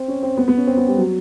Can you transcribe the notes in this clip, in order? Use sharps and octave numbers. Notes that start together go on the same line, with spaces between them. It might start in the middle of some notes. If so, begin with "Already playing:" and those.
Already playing: C4
C#4
C4
B3
B3
C#4
C4
B3
G3
F#3